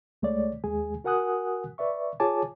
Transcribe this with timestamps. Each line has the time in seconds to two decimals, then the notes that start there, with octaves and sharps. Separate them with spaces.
0.22 C#2 G#3 A3 C#5 D5
0.64 D#2 G#3 G#4 G#5
1.04 F#4 A#4 F#5 G#5 D#6 F#6
1.78 B4 D5 E5 C#6
2.20 F4 G#4 C#5 G#5 A5 D6